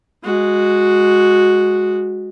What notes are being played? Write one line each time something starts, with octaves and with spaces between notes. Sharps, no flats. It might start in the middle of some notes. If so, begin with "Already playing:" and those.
G#3 F#4